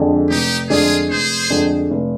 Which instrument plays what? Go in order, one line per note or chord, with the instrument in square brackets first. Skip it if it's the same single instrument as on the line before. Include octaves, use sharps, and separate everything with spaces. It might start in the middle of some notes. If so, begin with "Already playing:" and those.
Already playing: [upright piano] F2 D3 G#3 D4
[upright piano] F1 [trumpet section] D#4 G4
[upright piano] F2 D3 G#3 D4 [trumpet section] F4 G#4
[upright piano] F1 [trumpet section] G#4 C5
[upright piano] F2 D3 G#3 D4
F1